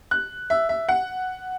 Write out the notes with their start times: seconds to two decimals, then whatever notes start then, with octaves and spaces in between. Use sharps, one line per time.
0.11 F#6
0.50 E5
0.69 E5
0.89 F#5